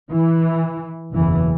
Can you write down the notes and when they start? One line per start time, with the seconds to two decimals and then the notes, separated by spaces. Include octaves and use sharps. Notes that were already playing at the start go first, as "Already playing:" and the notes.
0.10 E3
1.13 F#1 E2 B2 E3